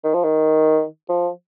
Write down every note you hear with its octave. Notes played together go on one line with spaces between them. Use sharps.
D#3
F3
D#3
F3